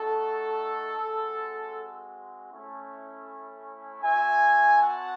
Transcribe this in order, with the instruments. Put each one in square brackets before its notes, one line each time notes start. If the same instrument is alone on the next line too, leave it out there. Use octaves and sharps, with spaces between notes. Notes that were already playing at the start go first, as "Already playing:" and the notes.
Already playing: [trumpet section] A3 D#4 F#4 A4
G#3 C4 F#4
A3 C#4 E4
C4 F#4 E5 G#5
F#5 A5